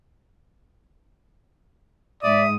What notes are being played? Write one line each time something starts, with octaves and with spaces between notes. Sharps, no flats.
G#2 D5 E5 D#6